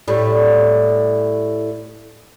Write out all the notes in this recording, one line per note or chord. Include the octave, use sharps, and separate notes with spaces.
A2 G3